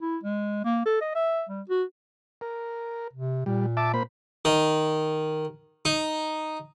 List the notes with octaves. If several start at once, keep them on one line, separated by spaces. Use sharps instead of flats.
E4
G#3
A#3
A4
D#5
E5
G3
F#4
A#4
C3
A#2 G3
E5 A5 D6
A#3 C5 B5
D#3
D#4